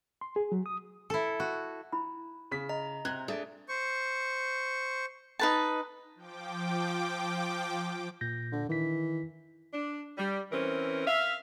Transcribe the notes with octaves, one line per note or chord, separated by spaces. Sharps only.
C6
G#4
F#3
D#6
E4 A4
F#4
E4 B5
C#3 B6
D#5 A#5
C3 F#6 G#6
A3 D4 G#4 D5
C5 C#6
D#4 B4 A5
F3 G5 D6
A#2 G6 A#6
D3
D#3 E3 B6
D4
G3
E3 C4 C#4 A#4
E5 F5